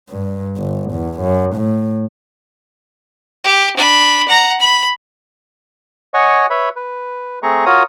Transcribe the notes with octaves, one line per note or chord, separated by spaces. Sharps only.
G2
G1
E2
F#2
A2
G4
D4 B5
F#5 A#5
B5
C#5 D#5 F#5 G#5 C#6
B4 C#5 E5 B5
B4
A3 C4 G#4 A#5 C#6
F4 F#4 A#4 C#5 A#5 D#6